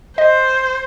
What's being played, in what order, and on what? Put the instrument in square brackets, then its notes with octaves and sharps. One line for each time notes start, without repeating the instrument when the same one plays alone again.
[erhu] C5 [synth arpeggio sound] D#5